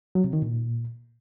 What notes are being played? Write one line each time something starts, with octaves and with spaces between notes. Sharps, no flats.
F#3
C3
D#3
A#2